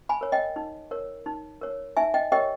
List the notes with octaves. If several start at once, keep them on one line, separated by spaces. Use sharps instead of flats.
G#5 B5
A#4 C#5
D#5 G5
D#4
A#4 C#5
D#4
A#4 C#5
D#4 E5 G#5
D#5 G5
G4 A#4 C#5 D#5 G5